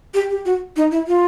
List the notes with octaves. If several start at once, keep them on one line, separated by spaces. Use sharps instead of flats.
G4
G4
F#4
D#4
E4
F4